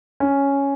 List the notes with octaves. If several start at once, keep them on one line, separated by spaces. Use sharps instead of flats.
C#4